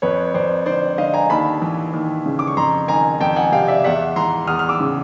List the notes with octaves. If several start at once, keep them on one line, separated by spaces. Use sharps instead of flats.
F2 B4 C#5
F2 C5 D5
D3 C5 D5
D3 D#5 F5
G#5 A#5
D#2 A5 B5
E3
D#2
C#3
D6
C#6
F2 A#5 C6
D#3 G#5 A#5
F2 G5 A5
F#5 G#5
C3 F5 G5
D5 E5
E2 E5 F#5
E3 A#5 C6
E2 D#6 F6
F6
D6 E6
C#3